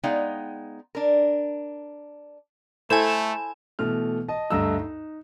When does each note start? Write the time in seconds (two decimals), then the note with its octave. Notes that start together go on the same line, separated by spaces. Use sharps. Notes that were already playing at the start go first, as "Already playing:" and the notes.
0.04 G#3 B3 D#4 D5 F5 G5
0.95 D4 A#4
2.90 A3 E4 A4 C5 G#5 E7
3.79 B2 E3 A3 F6
4.29 D#5 A5
4.50 D2 G2 A3 D#5 A#5 E6
4.79 D#4